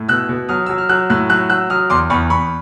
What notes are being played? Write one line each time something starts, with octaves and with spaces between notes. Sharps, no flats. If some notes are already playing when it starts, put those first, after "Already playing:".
Already playing: A2
B2 E6 F#6
B2
F#3 D#6 F6
F#3 E6
F6
F#3 E6 F#6
A2 E6 F#6
F#3 E6 F#6
F#3 E6 F#6
F#3 D#6 F6
E2 C6 D6
E2 B5 C#6
E2 B5 C#6